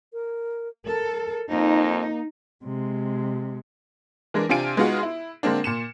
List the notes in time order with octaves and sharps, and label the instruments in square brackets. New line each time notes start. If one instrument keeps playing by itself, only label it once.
[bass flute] A#4
[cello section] A4 [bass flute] A#4
[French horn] F2 [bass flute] A#3 [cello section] D#4
[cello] C3 G#3
[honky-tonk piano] E3 G#3 D4 A#4
C3 C4 D4 F4 G#5 D7
G#3 B3 D#4 F4 F#4 G#4
E4
D3 G#3 A#3 C4 D4
A#2 C#7 E7